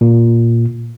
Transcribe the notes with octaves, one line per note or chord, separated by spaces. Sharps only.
A#2